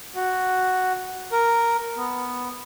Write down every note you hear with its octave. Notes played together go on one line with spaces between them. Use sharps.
F#4
A#4
B3